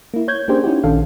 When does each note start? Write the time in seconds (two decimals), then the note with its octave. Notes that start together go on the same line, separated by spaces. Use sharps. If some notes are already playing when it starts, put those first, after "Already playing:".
0.14 A#3 E4
0.28 C#5 G6 G#6
0.48 A#3 C#4 D4 G4 G#4 C5
0.63 C#4 D#4 E4 F#4 G4
0.84 A#1 D#3 C#4 D4 A4 F5